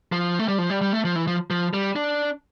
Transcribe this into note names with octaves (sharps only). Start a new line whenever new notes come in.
F3
A3
G3
F3
G3
G3
A3
F3
E3
F3
F3
G3
D4